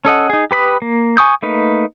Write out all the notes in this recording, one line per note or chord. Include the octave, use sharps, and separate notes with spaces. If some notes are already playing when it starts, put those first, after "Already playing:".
C#4 A4 D#5 F#5
D#4 G#4
G4 B4 B5 D#6
A#3
G#5 C#6 D#6 G6
A3 A#3 D#4 B4